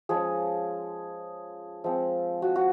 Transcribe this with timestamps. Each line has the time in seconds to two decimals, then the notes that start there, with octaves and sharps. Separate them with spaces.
0.09 F3 G#3 C#4 G#4
1.84 F3 G#3 C4
2.42 F#4
2.56 F#4